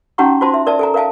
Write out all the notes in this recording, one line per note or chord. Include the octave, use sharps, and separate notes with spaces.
C#4 D#4 F#4 F#5 A#5 C#6
F4 F#4 C5 A5 C6
E5
A#4 D5 E5 A5
A4 G#5 A#5
A#4 E5 F5 G#5 A5